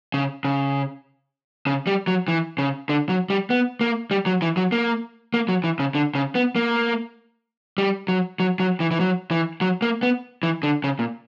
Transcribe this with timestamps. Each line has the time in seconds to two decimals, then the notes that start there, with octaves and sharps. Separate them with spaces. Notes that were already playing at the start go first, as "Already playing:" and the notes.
0.14 C#3
0.45 C#3
1.67 C#3
1.87 G3
2.07 F#3
2.28 E3
2.58 C#3
2.89 D3
3.09 F#3
3.30 G3
3.50 B3
3.81 A#3
4.11 G3
4.26 F#3
4.42 E3
4.57 F#3
4.72 A#3
5.34 A#3
5.49 F#3
5.64 E3
5.79 C#3
5.95 D3
6.15 C#3
6.35 B3
6.56 A#3
7.78 G3
8.08 F#3
8.40 F#3
8.60 F#3
8.80 E3
8.91 E3
9.00 F#3
9.31 E3
9.61 F#3
9.82 A#3
10.03 B3
10.43 E3
10.63 D3
10.84 C#3
10.99 A#2